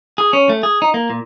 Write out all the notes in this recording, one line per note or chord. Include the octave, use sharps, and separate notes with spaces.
G#4
C#4
A3
G#4
D#4
A#3
A#2